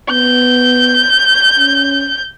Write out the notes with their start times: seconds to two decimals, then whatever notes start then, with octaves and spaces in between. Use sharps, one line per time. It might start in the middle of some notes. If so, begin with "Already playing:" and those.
0.10 B3 G6
1.58 C#4